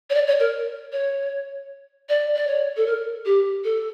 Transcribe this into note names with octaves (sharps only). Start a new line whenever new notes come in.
C#5
D5
C#5
A#4
C#5
D5
D5
C#5
A4
A#4
G4
A4